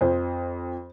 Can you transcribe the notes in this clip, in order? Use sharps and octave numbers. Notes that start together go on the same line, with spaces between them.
F2 C5